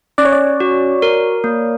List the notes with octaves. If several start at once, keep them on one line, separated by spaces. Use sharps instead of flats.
C#4 D5
C#5
D5
F#4
A#4
A#3